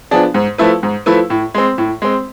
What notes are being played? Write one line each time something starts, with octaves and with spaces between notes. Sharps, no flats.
F3 B3 D4 G#4
G#2
F3 A3 E4 B4
G#2
F3 A3 E4 B4
A2
G#3 C4
A2
G#3 C4